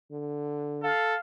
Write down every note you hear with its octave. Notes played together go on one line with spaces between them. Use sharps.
D3
A4 F5